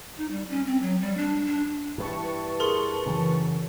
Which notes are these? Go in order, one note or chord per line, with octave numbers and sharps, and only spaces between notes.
D#4
G3
C#4
C4
F#3
G3
D4
D4
G2 E3 B4 A5 C#6
G#4 A#4 C6
F#2 C#3 E3